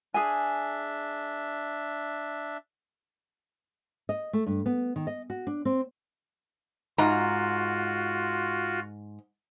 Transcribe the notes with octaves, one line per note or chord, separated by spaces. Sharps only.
D4 G#4 E5 G#5
D#5
A3
G2
B3
D#3
D#5
F#4
D4
C4
G#2 F4 F#4 A#5